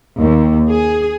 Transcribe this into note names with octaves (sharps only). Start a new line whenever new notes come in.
D#2
G#4